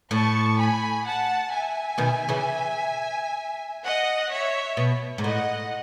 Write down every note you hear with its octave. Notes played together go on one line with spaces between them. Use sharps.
A2 A5 C#6
G#5 B5
F#5 A5
E5 G#5
B2 D#3
C#3 E3
D#5 F#5
C#5 E5
B2
G#2
A2 D#5 F#5